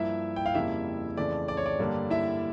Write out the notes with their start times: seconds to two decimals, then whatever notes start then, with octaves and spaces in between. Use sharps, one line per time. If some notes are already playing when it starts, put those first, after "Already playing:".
Already playing: G2 F3 A#3 E4 E5
0.36 G5
0.46 F5
0.54 F2 C#3 G3 A#3 E4 E5
1.17 F2 C#3 E3 A3 D5
1.48 D5
1.57 C#5
1.66 D5
1.79 G2 D3 G3 A#3
2.10 E4 E5